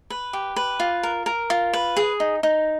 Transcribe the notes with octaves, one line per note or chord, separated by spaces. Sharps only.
B4
G4
B4
F4
A#4
A#4
F4
B4
G#4
D#4
D#4